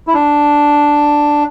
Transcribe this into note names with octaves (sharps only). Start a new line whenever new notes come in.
E4
D4